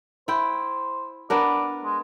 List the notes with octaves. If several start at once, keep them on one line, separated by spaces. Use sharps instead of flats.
E4 C5 G5
B3 D4 A#4 D5
G#3